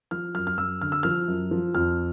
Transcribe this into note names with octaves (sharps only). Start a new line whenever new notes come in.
F3 F6
F#2 F6
F6
F#2 E6
D3 F6
E6
F3 F6
F#2
F3
F2 F6